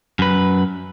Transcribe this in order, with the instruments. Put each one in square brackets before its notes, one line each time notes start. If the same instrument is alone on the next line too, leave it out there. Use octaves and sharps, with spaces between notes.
[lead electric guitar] F#2 B4